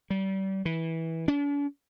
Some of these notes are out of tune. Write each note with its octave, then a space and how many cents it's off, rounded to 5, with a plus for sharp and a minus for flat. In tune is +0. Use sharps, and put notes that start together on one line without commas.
G3 -30
E3 -15
D4 -45